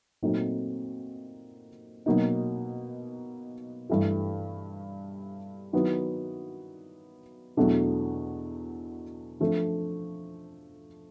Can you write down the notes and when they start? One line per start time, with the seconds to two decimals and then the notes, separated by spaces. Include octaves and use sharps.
0.22 A#2 F#3 A3 C4 D#4
2.06 B2 F#3 A#3 D#4
3.90 G2 E3 A3
5.73 D#3 F#3 B3 E4
7.57 E2 B2 F#3 A3 D4
9.40 F3 A3 D4